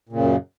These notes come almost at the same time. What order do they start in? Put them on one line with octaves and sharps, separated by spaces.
A#2 C#3 F#2